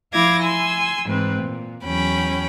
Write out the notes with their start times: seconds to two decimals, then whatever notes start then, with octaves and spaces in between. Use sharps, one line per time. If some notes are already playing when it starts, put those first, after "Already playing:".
0.13 F3 E4 F5 D6 G#6 A#6
0.42 G#5 C6 E6
1.06 G#2 E3 C4 B4
1.42 A#2
1.85 E2 F#3 C#4 G5 B5